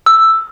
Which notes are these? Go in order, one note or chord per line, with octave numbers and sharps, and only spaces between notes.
E6